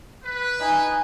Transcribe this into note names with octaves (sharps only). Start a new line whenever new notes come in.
B4
D#4 G#5